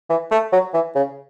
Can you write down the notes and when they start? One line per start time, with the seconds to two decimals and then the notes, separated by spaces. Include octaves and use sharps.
0.09 E3
0.31 A3
0.52 F#3
0.74 E3
0.95 C#3